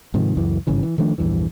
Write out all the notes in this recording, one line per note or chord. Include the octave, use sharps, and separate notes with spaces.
G#2 C3 D#3 F3
C#2 F#2 E3
G#1 G2 C#3 E3
E3
D#3 F3 A3 D4
A#1 E2 G2 E3